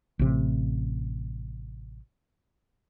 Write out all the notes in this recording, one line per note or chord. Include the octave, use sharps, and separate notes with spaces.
A1 C3